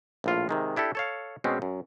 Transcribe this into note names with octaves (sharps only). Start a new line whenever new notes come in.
A#1 A2 F4
C3 D#3 G#3
D4 E4 G4 A4
A4 C#5 F5
B2 G#3 C4 C#4
F#2